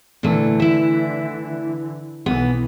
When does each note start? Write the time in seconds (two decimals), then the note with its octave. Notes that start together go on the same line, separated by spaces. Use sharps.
0.23 A#2 D3 E3 A3
0.60 E4 E5
2.26 B1 E3 B3